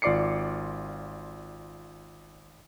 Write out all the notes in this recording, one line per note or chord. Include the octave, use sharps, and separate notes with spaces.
G#1 F4 D5 D6 C7 C#7